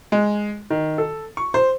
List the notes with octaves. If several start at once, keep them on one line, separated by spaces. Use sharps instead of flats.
G#3
D#3
A4
C#6
C5